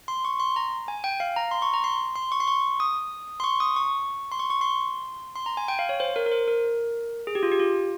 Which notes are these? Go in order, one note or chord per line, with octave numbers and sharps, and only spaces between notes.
C6
C#6
C6
A#5
G#5
G5
F5
A#5
C6
C#6
A#5
C6
C6
C#6
C6
C#6
D#6
C6
C#6
D#6
C#6
C6
C#6
C#6
C6
C6
A#5
G#5
G5
F5
C#5
C5
A#4
A#4
C5
A#4
G#4
G4
F4
G4
F4